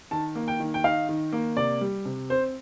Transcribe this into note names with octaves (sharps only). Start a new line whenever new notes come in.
D#3 A5
A#3
G5
D#3
G5
D#4 F5
D#3
A#3
C3 D5
G3
C3
C4 C5